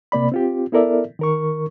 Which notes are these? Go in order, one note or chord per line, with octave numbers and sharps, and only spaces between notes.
C3 A#3 D5 B5
C4 F4 G4
B3 E4 A4 A#4 D5 E5
D#3 A#4 C#6